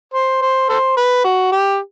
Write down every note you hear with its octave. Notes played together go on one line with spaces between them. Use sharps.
C5
C5
A4 C5
B4
F#4
G4